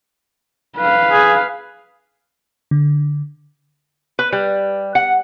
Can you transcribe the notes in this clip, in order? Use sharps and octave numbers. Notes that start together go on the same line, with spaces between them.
B4 F5
G#4
D3
B4
G3
F#5